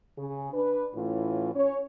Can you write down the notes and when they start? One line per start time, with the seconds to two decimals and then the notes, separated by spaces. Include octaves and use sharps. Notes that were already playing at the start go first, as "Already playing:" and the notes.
0.18 C#3 G#4
0.53 D4 B4
0.95 A2 E3 C#4 F4
1.55 C#4 C#5